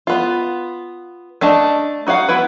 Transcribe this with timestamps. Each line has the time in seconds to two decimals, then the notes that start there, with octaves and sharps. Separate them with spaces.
0.07 B3 F4
1.41 A3 D4 D#5 A5
2.07 D#4 F#4 C#5 F5 F#5
2.28 B3 E4 B4